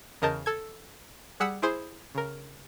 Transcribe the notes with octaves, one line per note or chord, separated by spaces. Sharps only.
E2 C#3 A#4 D#5 A5 G6
A4 G#6
G3 G#4 F#5 E6 B6 C#7
E4 G#4 C5
C#3 A#4